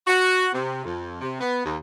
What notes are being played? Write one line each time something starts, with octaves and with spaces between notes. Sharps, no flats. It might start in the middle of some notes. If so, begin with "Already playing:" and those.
F#4
C3
F2
C3
B3
D#2